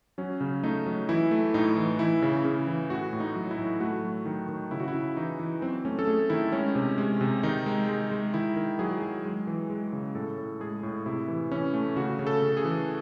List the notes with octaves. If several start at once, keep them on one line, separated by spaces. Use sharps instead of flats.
F#3 C#4
C#3
A3 D#4
F#3
E3 E4
A3
A2 D#4
E3
E3 E4
C#3
C#3
E3
A2 F#4
A2
D#4
F#3
E4
A2
A3 F#4
F#3
D#3
D#3
C#3 E4
F#4
E4
C#3
E3 D#4
E3
F#3 C4
A3 C#4
A4
A3 G#4
D#3 E4
G#3 C#4
C3
G#3
C3
D#3 D#4
G#3
G#3
G#3
D#3 E4
D#3
F#3 G#4
F#3
G#3
E3
G#3
C#3
A2 A4
A2
G#3 G#4
A2
C3 E4
E3
E3 C#4
A3
C#3 F#4
C#3
A4
C#3
G#4
E3